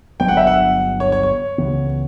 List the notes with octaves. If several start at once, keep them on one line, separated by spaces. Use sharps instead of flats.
G1 G2 F#3 B3 G5
F#5
E5
F#5
C#5
C#5
C#5
C#2 C#3 E3 B3